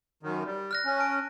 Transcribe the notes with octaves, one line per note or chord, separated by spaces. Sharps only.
F#2 D#3
G3
F6 F#6 A#6
C#4
A5 D7